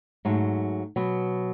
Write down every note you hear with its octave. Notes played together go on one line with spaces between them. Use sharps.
G#2 F#3 A3
B2 F#3 B3